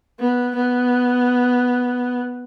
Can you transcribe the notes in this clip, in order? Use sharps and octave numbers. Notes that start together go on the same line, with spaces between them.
B3
B3